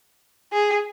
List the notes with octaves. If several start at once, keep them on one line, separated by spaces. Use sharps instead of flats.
G#4